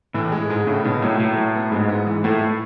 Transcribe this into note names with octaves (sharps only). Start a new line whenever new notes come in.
A2 E3
G#3
G#2 G#3
A2 C#3
B2 D#4
A2 F#3
A2 F#3
F#3
B3
G#2 G#3
B3
E3
A2 A3
A3